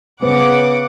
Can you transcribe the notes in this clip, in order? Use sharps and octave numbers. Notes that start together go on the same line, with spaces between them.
C#3 B3 F#5 D6